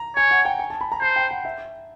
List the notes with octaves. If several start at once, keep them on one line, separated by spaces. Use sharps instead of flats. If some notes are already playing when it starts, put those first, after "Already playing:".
Already playing: A#5
C#5 G#5
F#5
G5
G#5
A5
B5
A#5
C5 A5
G5
F#5
E5